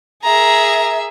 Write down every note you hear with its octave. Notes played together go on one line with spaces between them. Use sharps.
G#4 A#4 E5 A#5